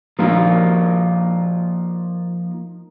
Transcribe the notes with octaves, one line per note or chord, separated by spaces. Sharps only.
F3 A#3 D#4 F4 A#4